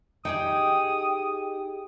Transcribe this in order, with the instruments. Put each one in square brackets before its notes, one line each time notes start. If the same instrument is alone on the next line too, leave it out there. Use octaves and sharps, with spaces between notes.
[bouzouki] D#4 G4 G#4 [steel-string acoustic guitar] G5 [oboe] D#6